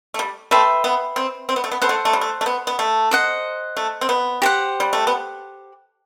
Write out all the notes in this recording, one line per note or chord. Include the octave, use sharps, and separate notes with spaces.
A3
G3
A3 B4 E5 G5 C6
B3
C4
C4
B3
A3
B3
B3 A4 C5 F#5
A3
A3
G3
A3
A3
B3
B3
A3
C5 D#5 F#5
A3
C4
B3
G4 C5 F#5
G3
A3
B3